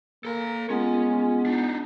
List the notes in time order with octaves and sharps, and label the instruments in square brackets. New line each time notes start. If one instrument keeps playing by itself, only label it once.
[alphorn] A#3 [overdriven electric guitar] A4 A#5
[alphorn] G#3 [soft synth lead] B3 [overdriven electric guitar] C#4 [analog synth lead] F4
[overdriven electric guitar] D4 D#4